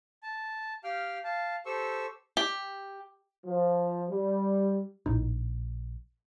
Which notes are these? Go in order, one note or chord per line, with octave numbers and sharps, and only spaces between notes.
A5
G4 F5 G5 F6
F5 A5
G4 A4 C5 C#6 E6
G4
F3
G3
A#1 A2 D#4